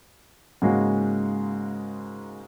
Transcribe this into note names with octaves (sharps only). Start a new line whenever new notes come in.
G#2 C#3 G#3 A#3 F#4